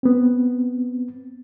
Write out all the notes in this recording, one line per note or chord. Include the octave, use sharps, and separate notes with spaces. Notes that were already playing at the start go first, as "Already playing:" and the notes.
B3 C4